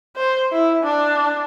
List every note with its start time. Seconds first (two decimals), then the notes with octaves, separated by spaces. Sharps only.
0.16 C5
0.52 E4
0.83 D4